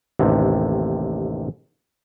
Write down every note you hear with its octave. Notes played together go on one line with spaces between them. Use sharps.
A1 D#2 C3